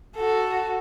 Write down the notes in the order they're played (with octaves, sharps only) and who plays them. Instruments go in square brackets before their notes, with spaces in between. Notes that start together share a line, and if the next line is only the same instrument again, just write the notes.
[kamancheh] F#4 A4